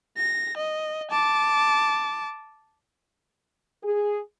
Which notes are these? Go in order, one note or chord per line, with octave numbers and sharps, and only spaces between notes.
A#6
D#5
A5 D6
G#4